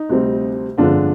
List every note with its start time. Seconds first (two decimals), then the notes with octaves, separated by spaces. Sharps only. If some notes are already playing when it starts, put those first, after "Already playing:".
Already playing: D#4
0.09 D2 C3 G3 C4
0.78 G1 F2 D3 F3 G#3 D4 F4